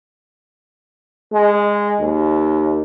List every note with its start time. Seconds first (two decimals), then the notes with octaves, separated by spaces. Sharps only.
1.33 G#3
2.00 D#2